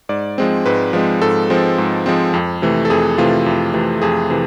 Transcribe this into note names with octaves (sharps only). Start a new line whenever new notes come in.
G#2 D5
F3 G#3 C4
G#2 B4
F3 G#3 C4
G#2 A4
F3 G#3 C4
G#2
F3 G#3 C4
F2
C3 E3 A3
A4
F2 G#4
C3 E3 A3 F4
F2
C3 E3 A3
F2 G#4
C3 E3